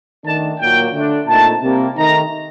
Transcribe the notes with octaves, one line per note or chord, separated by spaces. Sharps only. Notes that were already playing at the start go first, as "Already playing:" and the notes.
D#3 A3 D4 A5
A#2 F#3 A#3 G5
D3 A3 D4
A#2 A3 C4 D#4 A5
C3 G3 A#3
D#3 A3 D#4 A#5